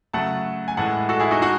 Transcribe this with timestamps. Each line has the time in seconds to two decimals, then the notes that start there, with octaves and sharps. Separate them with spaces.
0.13 C#3 F#3 A3 F#5 A5
0.68 G#5
0.77 A2 E3 G#3 F#5 A5
1.09 F#4 A4
1.20 E4 G#4
1.31 D#4 F#4
1.42 G#3 D#4 F#4